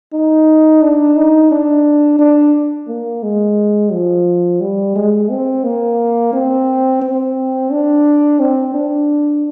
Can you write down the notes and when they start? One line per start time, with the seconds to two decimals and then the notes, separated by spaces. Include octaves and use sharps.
0.13 D#4
0.82 D4
1.16 D#4
1.51 D4
2.19 D4
2.88 A#3
3.23 G#3
3.92 F3
4.61 G3
4.96 G#3
5.30 C4
5.64 A#3
6.33 C4
7.02 C4
7.71 D4
8.40 C4
8.74 D4